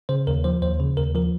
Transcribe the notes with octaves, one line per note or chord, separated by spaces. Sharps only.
C#3 C5
D#2 A#4
F3 C5
D#2 C5
C#3
D#2 A#4
F3 A#4